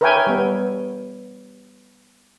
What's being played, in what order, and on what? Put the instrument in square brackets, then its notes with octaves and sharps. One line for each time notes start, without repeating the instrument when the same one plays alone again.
[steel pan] A#4 B4 C#5 E5 G5 G#5
G3 B3